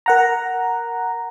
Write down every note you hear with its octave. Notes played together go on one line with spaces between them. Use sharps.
A#4 F#5 A#5